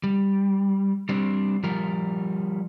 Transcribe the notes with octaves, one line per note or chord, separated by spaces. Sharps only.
G3
G3 C4 D4
F3 G3 A#4